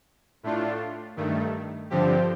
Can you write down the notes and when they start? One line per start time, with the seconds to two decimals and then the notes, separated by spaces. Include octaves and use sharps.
0.43 A2 A3 D4 F4
1.17 G2 D#3 A3
1.90 G2 D3 F3 C4 G4